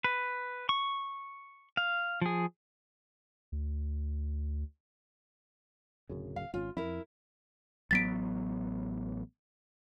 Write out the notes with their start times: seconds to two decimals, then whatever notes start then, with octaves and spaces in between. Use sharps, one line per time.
0.04 B4
0.69 C#6
1.77 F5
2.21 F3 G#4
3.52 D2
6.09 D1 F#2 C#3
6.36 F5
6.54 G#1 C#4 F4
6.77 F2 E4 A#4
7.91 A1 F#3 B3 A6 B6 D7